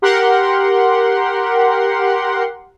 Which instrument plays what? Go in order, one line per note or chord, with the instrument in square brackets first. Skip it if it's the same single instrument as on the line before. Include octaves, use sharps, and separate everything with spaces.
[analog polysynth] G4 A#4 F#5 C6